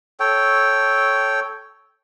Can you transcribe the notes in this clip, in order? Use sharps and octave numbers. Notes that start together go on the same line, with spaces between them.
A4 C#5 G5